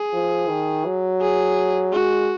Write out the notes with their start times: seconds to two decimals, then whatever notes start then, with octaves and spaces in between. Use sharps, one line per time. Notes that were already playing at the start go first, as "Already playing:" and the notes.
Already playing: G#4
0.13 F3
0.49 D#3
0.85 F#3
1.21 G#4
1.93 G#3 F#4